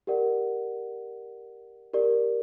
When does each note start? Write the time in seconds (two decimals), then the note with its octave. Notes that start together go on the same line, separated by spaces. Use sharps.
0.07 G4 A#4 D5 F#5
1.94 G4 A#4 D5